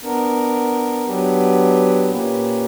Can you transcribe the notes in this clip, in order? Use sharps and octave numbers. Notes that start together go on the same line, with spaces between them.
B3 D4 A#4
F#3 B3 D4 G4 B4
A#2 A#3 C#4 G4 B4